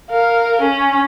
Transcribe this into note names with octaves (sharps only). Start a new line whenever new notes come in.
A#4 F5
C#4